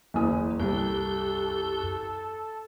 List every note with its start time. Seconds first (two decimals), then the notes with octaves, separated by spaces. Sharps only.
0.14 F#1 E2 D#6
0.60 C2 F#2 G4 A4